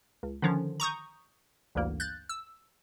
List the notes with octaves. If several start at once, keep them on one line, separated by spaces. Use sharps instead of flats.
C#2
D3 D#3 F3 C#4
A#5 C#6 D#6 G6
A1 D2 G2 A#3
F#6 G6 A6
E6